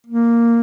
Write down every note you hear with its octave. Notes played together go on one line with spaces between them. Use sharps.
A#3